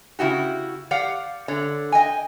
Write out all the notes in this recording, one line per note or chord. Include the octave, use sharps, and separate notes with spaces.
C#3 E4 F#4 G4
G4 D5 F5 F#5
D3 C#5 D5
D#5 G5 G#5